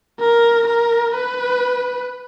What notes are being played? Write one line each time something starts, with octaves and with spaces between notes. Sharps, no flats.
A#4
A#4
B4